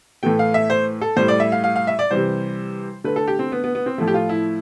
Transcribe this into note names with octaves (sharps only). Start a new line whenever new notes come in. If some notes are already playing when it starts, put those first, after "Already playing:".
A2 E3 A3 G5
F5
E5
C5
A4
A2 G3 C5
D5
E5
F5
F5
F5
E5
D5
C3 E3 G3 C5
D3 A3 B4
A4
G4
C4
B3
B3
B3
C4
A2 F3 A3 E4
G4
F4
E4